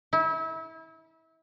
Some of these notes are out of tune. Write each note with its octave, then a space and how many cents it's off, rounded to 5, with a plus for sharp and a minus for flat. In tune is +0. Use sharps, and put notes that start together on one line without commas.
E4 -30